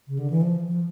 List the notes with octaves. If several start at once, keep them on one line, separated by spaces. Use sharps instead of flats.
C#3
D3
E3
F3
F3